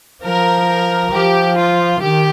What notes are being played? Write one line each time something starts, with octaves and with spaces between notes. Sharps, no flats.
F3 A#4
F3 G4
F4
D#3 G4